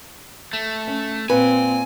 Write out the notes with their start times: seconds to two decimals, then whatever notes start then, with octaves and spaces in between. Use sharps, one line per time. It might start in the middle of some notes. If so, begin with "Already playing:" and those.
0.53 A3
0.87 C#4
1.30 A#2 C4 B4 G#5